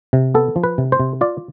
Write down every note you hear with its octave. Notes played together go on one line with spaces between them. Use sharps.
C3
B3 A4
F3
B4
C3
C5
C3
F4 D5